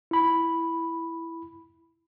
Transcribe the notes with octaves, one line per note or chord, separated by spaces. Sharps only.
E4 B5